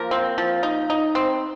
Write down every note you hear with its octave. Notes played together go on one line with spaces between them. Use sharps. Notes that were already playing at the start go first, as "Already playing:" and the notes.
Already playing: F3 A#3 A#4
C4
F3
D#4
D#4
C4